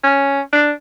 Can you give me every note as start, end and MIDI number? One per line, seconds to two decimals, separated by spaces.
0.04 0.40 61
0.53 0.72 62